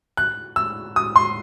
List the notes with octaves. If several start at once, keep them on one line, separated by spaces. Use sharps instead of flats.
F#6
E6
D#6
C6